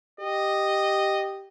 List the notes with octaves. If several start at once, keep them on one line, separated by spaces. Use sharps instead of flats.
G4 D#5